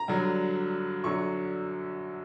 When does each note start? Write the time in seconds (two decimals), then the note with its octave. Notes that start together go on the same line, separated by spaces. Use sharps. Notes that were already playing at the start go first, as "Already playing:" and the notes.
Already playing: A#5
0.08 G2 D3 F#3
1.04 F#2 D3 F#3 C#6